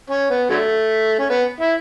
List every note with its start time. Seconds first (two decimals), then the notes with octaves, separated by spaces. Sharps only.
0.10 C#4
0.30 B3
0.50 D3 F#3 A3
1.19 C#4
1.30 B3
1.60 E4